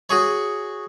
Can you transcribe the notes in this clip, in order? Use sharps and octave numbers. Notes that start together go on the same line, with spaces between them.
F#4 G#4 C#5